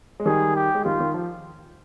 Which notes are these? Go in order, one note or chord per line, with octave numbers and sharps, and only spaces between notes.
G#3
D#3 G3 G#4
G4
G#3
D#3 G3 F4
D#3
F3